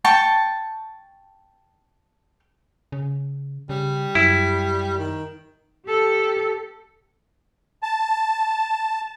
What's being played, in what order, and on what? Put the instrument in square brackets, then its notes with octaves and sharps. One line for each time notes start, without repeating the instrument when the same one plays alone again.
[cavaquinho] G5 A5 C#6
[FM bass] C#3
[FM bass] C#3 [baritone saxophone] G3
[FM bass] F#2 [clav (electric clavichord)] E4
[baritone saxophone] D#3
[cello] G4 A4
[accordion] A5